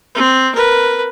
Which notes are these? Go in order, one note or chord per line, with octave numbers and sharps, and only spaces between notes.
C4
A#4 B4